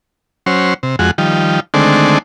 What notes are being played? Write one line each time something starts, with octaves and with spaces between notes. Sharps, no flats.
F#3 C#4 C5
C3
F2 G#3 F#4
D#3 F3 G3
D3 D#3 G#3 A3 C4 D4